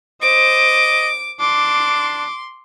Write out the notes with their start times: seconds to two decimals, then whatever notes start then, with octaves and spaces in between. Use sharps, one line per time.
0.22 C5 D#5 D6
1.40 D4 C6 D6